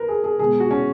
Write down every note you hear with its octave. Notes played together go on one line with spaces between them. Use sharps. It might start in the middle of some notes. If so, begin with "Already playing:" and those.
Already playing: A#4 B4
G#4
G#4
B2 G#3 G#4
F#4
C#4